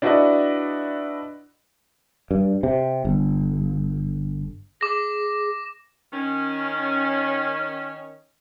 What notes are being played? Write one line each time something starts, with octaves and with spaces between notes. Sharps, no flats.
D4 E4 F#4 B4 D5 D#5
G2
C3
G1
G#4 D6 A#6
D#3 C#4